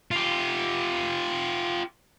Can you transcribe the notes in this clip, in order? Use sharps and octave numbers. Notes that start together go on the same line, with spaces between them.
F4 G4